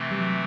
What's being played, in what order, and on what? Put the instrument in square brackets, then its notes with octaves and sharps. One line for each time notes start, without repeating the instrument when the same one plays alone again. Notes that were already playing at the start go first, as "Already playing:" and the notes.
Already playing: [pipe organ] C3 E3 A3 C4
[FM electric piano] G3
F#3